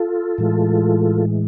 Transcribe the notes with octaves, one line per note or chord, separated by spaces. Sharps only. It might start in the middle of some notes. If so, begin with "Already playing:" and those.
Already playing: F4 A4
A2 E3 G#3